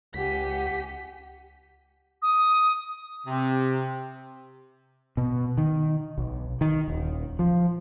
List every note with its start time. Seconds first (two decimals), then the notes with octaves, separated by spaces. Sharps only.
0.14 C#2 G4 F#5 G#5 B6
2.22 D#6
3.27 C3
5.17 B2
5.58 D#3
6.18 B1
6.61 D#3
6.88 D#1
7.39 F3